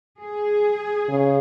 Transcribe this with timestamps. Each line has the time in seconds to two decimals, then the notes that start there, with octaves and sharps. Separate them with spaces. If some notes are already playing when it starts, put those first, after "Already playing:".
0.23 G#4
1.08 C#3